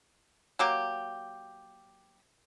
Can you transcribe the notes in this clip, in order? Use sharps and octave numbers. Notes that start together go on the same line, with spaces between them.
F#3 A#3 G4